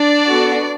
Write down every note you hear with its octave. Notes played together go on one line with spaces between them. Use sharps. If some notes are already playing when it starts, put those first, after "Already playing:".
Already playing: D4 D5
B3 F#4 A4